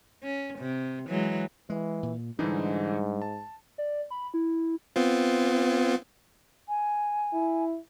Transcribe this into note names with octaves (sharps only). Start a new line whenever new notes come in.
C#4
C3
E3 F#3 G#3
E3 G#3
A#2
G#2 D3 E3 G3 D4 D#4
A5
D5
B5
E4
B3 C4 F4
G#5
E4